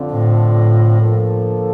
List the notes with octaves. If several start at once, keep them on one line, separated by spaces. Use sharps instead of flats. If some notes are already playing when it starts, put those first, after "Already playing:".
Already playing: F2 D3 F3 C4 F4
A2
D3 F3 A#3 F4 A4